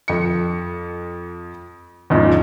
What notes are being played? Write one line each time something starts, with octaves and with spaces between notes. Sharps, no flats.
F2 C#7
E2 G#2 C#3 F3